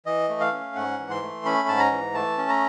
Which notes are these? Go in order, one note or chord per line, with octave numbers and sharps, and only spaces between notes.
E3 D#5
A3
F5
C#4
G#2 F#5
E3
C6
A3
C#4 B5
G#2 A5
A#5
E3
A3 A5
C#4
A#5